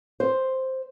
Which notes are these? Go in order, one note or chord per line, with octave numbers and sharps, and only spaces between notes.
C5